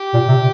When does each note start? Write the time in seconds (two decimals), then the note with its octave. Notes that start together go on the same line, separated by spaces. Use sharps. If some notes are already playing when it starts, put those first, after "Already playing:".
Already playing: G4
0.14 A#2
0.28 C3